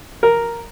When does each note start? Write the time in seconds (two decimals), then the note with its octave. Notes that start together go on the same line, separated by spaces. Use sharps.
0.23 A#4